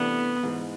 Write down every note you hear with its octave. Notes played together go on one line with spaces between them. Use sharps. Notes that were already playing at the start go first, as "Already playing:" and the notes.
Already playing: C3 E3 A3 B3 D4
G#2 E3 G#3